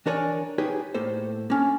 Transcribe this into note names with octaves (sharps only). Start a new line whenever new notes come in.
E3 D4 A#4 C#5 D5 G#5
D#4 G4 G#4 B4 C#5
A2 A#3 A4 C5
A#3 C#4 D4